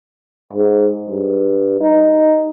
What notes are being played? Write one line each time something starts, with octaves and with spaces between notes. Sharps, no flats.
G#2
G2
D#4